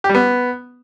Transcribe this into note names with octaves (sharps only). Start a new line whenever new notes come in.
G4
G3
B3